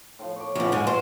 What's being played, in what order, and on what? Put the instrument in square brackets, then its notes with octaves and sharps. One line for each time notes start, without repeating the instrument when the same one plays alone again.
[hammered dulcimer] A2 F3
C#5 D6
[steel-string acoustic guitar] F2 C#3 [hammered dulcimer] F3 F#4 B4
[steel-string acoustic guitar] G#2 G#3 [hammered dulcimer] E3
[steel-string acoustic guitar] C5